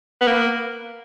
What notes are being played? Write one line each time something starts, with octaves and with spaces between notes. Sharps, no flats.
B3
A#3